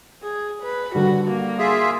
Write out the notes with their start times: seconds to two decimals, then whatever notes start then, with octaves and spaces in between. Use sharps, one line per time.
0.23 G#4
0.63 B4
0.95 D3 G3 F#4
1.28 A#3
1.59 F4 G#4 E5